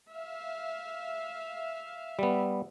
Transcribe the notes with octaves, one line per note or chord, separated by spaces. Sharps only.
E5 F5
G3 B3